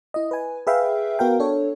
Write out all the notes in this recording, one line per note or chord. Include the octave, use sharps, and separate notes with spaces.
E4 D#5
B4 G#5
G#4 B4 E5 F5 G5
B3 F#4 A#4 F5 G5
D4 A4 C#5